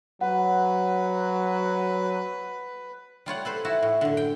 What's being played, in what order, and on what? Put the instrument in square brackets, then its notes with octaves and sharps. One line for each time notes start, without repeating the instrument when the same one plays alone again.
[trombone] F#3 [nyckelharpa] B4 [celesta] F#5
[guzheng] G3 F4 C#5 F#5
A4 B4 C5
E4 F#4 A5
A2
F#2 D3
G5